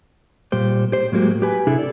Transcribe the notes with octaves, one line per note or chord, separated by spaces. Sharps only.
A#2 G3 G4 C5
G4 C5
A2 F#3 G#3 A#3 F#4 G4
G4 B4 G#5
C3 D4 E4 G#4 A4
A4 D5